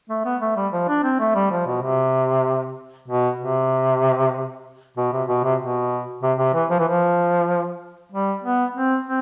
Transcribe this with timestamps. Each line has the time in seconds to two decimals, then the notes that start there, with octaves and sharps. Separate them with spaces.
0.09 A3
0.25 B3
0.41 A3
0.56 G3
0.72 F3
0.88 D4
1.04 C4
1.20 A3
1.35 G3
1.51 F3
1.66 B2
1.82 C3
3.08 B2
3.40 C3
4.97 B2
5.12 C3
5.28 B2
5.44 C3
5.60 B2
6.22 C3
6.39 C3
6.54 E3
6.70 F3
6.79 E3
6.88 F3
8.12 G3
8.43 B3
8.75 C4
9.06 C4